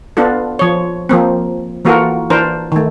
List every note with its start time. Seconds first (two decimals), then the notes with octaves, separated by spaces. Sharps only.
0.17 B3 D4 F4 A4
0.59 F3 C#5
1.09 F3 A#3 C4
1.85 E3 A#3 F4 F#4 A4 A#4
2.30 E3 D4 A#4 C5
2.72 D#3 A3